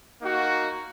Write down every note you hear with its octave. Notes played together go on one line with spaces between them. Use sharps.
A#3 D#4 F#4